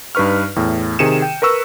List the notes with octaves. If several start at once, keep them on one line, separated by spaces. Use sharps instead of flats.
G2 D#4 B4 C#6 F6
E2 A2
C3 D#3 G#4 C#7 D#7 E7
G5
A#4 B4 C#6 E6